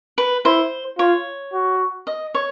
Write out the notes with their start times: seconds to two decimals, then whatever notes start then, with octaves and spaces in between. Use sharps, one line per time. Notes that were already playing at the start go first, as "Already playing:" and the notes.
0.18 B4
0.45 E4 C5
0.98 F4 C#5
1.53 F#4
2.07 D#5
2.35 C#5